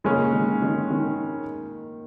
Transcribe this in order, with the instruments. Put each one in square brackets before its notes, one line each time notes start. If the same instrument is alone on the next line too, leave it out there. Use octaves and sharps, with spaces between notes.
[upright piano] A#2 A#3 [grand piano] C#3 G#3 C#4
[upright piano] D#3
D#3
D#3